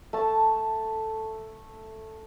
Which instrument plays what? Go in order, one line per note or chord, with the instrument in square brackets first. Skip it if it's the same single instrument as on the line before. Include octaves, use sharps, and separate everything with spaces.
[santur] A3 A5